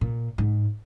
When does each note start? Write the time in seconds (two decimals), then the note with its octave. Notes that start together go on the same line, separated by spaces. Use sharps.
0.01 A#2
0.38 G#2